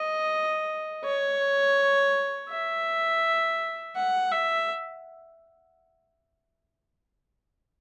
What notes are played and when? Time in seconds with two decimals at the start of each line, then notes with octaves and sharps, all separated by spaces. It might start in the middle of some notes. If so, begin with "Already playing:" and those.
Already playing: D#5
1.04 C#5
2.50 E5
3.96 F#5
4.32 E5